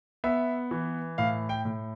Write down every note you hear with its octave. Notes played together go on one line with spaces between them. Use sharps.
B3 E5
E3
A2 F5
G5
A2